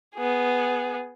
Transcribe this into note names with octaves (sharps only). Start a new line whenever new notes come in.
B3 G#4